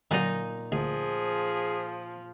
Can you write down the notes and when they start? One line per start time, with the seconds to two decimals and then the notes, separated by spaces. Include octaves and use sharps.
0.11 A#2 D3 F#3 G3 D#4
0.72 D2 F3 G#4